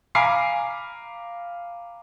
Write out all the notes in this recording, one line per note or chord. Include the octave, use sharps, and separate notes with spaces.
F5 G#5 A#5 B5 D6 C7